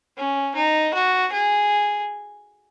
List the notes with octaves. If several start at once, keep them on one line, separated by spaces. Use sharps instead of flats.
C#4
D#4
F#4
G#4